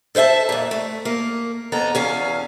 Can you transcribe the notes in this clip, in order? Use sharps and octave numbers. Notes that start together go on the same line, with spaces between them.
A4 C5 C#5 E5 A5
F2 A#2
A3
A#3
F2 B3 A4 A#5
E2 C#4 F5